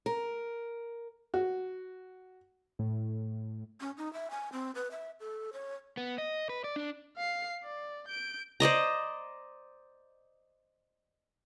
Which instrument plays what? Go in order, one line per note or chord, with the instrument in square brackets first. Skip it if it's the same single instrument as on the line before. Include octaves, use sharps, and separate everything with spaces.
[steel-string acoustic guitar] A#4
[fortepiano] F#4
[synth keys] A2
[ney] C#4
D#4
E5
G#5
C4
B4
E5
A4
C#5
[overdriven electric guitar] B3
D#5
B4
D5
D4
[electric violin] F5 C7
D5
G6 D7
[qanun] C5 D5 D#5 A#5